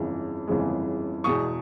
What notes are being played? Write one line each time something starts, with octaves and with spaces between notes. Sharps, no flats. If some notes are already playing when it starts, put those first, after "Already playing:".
Already playing: G1 F2 C#3 E3 G#3
G1 F2 C#3 E3 G#3
E2 B2 G#3 C#6 D#6